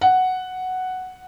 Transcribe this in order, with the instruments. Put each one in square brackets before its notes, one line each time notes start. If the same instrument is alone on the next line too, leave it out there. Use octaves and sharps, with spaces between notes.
[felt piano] F#5